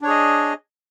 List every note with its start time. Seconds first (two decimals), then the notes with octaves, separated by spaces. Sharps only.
0.01 D4
0.04 C#5
0.07 G#4
0.10 D#5